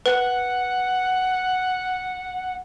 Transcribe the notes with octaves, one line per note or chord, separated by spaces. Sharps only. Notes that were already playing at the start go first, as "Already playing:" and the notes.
B4 F#5